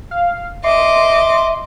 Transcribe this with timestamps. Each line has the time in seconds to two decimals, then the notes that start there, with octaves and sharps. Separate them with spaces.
0.11 F5
0.64 D#5 E5 C6 D6